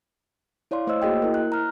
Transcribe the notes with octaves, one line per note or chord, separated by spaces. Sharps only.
E4 C#5 D5 F5 C6
A3 C5 C#5 D#5 E6
A#3 F#4 G#4 D#5 G5
E4 A#4
F#6
A#5 F6